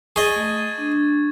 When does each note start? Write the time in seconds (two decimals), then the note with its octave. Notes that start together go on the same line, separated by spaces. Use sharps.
0.16 G#4 D#5 C#6 G#6 A6
0.36 A3
0.78 D4